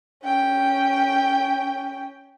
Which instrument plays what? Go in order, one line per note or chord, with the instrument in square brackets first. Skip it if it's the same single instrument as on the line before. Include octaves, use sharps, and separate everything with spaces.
[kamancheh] C#4 G5